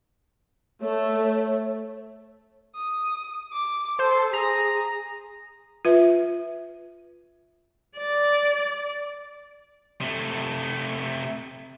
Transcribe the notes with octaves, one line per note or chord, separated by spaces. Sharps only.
A3 C#5
D#6
D6
A4 C5
G#4 A#5
F4 B4 E5
D5
C3 A3